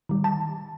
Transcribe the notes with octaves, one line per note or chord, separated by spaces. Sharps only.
D#3 G3
A5